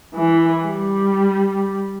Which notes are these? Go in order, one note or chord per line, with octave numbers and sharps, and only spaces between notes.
E3
G3